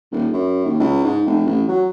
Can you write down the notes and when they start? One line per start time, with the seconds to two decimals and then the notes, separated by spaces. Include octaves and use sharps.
0.11 D#1
0.33 F#2
0.65 D#2
0.80 C#2
1.04 G#2
1.26 F1
1.45 A1
1.68 F#3